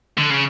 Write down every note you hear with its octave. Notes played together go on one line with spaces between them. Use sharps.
D3
C#3